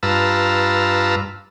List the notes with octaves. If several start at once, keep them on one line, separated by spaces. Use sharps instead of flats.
G2 F4 B4 A5 A#5 E6